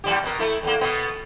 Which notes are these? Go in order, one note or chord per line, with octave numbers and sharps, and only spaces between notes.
E2 G3 G4
B2 A#4
A3 E4
E2 A#3
B2 B3